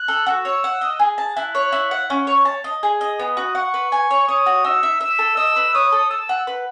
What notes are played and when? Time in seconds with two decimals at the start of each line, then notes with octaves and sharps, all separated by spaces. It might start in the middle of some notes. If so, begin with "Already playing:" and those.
Already playing: F#6
0.08 A4
0.27 F#4 E6
0.45 C#5
0.64 F#5
0.81 D#5
0.99 G#4
1.18 A5
1.36 E4 F#6
1.55 C#5
1.72 E4
1.91 F#5
2.10 C#4
2.27 C#5
2.45 A5
2.64 D#5
2.83 G#4
3.01 D#5
3.18 B3 D#6
3.37 F#4
3.55 F#5 C#6
3.74 B4
3.92 G#5
4.11 C#5
4.28 C#5 D#6
4.46 F#4
4.64 D#4 E6
4.83 E5
5.01 E5 E6
5.19 A4
5.37 D#5 E6
5.56 B4
5.74 C#5 D#6
5.92 A4
6.10 A5 E6
6.29 F#5
6.47 B4